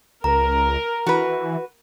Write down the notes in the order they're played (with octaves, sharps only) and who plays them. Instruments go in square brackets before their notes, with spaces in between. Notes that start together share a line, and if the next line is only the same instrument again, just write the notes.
[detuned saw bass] C#2 [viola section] A#4 [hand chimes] A#5
[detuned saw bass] E3 [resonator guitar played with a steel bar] F#4 B4